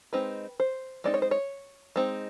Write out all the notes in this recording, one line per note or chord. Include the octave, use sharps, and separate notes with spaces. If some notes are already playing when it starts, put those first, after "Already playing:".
G#3 C4 D#4 B4
C5
G#3 C4 D#4 D5
C#5
C5
C#5
G#3 C4 D#4